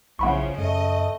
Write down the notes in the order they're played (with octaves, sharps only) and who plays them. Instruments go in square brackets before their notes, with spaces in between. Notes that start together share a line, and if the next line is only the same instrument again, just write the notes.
[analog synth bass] B1 [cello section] C#3 F3 [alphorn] E3 [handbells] F#5 B5 C#6
[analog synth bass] F#2 [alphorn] A3 [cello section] D#5